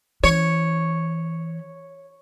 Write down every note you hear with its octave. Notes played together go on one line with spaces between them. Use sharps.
E3 C#5